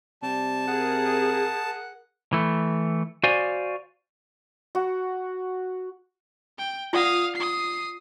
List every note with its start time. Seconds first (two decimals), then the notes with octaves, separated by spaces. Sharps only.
0.23 C3 G3 A5
0.68 G#4 A#4 F#5
2.33 E3 A3
3.24 F#4 C5 D5 F5 G#5
4.75 F#4
6.58 G5
6.93 F4 D5 F5 F#5 D#6
7.35 D#6 C7